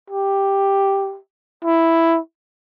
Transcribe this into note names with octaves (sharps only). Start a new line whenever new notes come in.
G4
E4